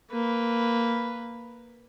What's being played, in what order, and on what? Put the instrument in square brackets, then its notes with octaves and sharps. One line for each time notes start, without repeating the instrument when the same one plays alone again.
[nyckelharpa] A#3 B4